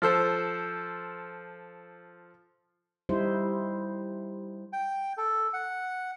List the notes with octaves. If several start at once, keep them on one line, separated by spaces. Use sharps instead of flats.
F3 A4 C5
G3 D#4 E4 C5
G5
A4
F#5